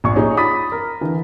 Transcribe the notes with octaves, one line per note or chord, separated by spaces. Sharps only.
A#1 C#6
C#4 D#4 G#4
B5 D#6 A6 B6
A#4
D3 E3